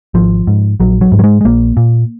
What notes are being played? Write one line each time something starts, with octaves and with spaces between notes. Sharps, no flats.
G#1 F3
G#2
A#1 F#3
F#3
G#2
F#3
G#3
G#3
A#1 A#3
A#2